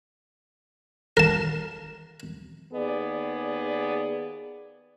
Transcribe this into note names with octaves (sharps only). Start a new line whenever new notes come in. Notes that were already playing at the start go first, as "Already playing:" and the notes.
A#4 A5
D#2 B3 G#4 D5